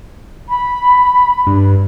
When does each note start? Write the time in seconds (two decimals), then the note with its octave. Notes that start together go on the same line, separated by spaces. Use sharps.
0.49 B5
1.47 G2